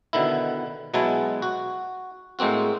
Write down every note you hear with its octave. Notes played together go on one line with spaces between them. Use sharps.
B2 D3 D#3 E4
B2 F#3 G#3 E4 G#5 A5
F#4
A2 G#3 A#3 C4 F#4